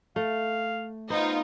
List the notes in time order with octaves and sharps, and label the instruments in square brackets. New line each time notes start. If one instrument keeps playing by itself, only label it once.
[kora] A3 [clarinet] F5
[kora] B3 [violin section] D#4 F4 [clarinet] C5